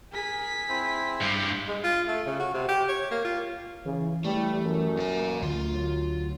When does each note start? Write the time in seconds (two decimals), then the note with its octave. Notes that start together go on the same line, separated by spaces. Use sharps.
0.12 G#4 A#4 B6
0.69 C4 E4 C5
1.22 G2
1.67 G#3
1.84 F4
2.08 A3
2.26 C#3
2.39 F#4
2.54 C3
2.68 G4
2.88 C#5
3.11 A#3
3.25 F4
3.85 C#3 E3
4.24 G3 A3
4.63 F#2
4.97 A#2 G#5
5.42 D2 F4
5.74 F#3